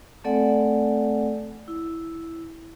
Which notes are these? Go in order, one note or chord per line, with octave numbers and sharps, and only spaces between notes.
A3 C4 A4 D5 F#5 G#5
E4